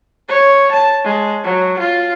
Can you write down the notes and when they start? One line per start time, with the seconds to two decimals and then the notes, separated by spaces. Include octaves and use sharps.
0.28 C#5
0.71 A5
1.04 G#3
1.44 F#3
1.79 F4